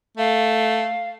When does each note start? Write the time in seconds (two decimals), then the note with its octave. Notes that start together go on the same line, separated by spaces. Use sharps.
0.18 A3 F5